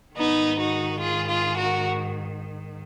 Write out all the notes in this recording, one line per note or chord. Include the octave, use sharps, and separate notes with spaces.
G#2 D#3 B3 D#4
D#4 F#4
F4 G#4
F4 G#4
F#4 A#4